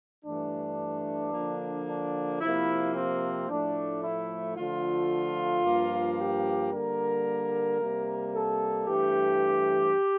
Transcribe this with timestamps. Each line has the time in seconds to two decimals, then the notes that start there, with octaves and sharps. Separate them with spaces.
0.25 G2 E3 A3 D4
1.33 D3 F3 A#3
1.87 D4
2.41 C3 F3 A#3 E4
2.95 C4
3.49 A2 F3 A3 D4
4.03 E4
4.56 D3 F3 A3 F4
5.64 G2 F3 A#3
6.18 G4
6.72 D3 G3 A#3 A#4
7.80 C3 G3 A#3
8.34 A4
8.87 G2 E3 A3 G4